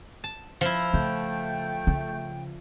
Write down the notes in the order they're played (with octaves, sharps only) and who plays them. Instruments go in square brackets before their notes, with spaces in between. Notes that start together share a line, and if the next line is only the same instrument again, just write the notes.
[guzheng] A5
F3 E4
[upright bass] C#3 [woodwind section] A3 G5
[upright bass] C#3